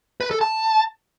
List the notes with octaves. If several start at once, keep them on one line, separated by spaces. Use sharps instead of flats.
B4
A4
A5